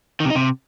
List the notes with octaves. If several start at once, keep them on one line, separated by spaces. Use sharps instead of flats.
D#3
C3
D#4
C3